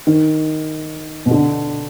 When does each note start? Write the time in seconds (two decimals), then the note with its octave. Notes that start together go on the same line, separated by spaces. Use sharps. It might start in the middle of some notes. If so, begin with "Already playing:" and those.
0.07 D#3
1.26 B2
1.31 D3